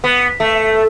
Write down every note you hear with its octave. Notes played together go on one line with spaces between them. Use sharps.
B3
A3